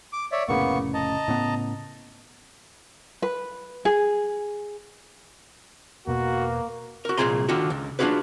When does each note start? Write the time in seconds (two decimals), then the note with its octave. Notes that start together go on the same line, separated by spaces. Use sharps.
0.13 D6
0.32 C#5 D5 E5
0.48 F1 A2 C#3 A#3 B3 C#6
0.94 D#5 A5 A#5
1.28 A2 C#3 B3
3.22 B4
3.85 G#4
6.07 E1 B2 A#3 B3 F#4
7.05 F#4 A#4
7.17 C2 A#2 F4 G#4 A#5 C6
7.48 D3 D#3 F4 F#4 A4
7.70 C#2
7.99 D4 D#4 F4 F#4 G#4 B4